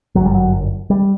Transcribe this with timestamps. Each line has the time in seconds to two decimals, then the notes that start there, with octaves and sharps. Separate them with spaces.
0.15 G1 F#2 F#3
0.26 G3
0.35 F#3
0.90 G3